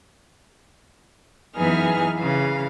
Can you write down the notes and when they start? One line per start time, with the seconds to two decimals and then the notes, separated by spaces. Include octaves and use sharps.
1.56 F#2 E3 B3 D#4 G#4 F6
2.18 C#3 E3 F5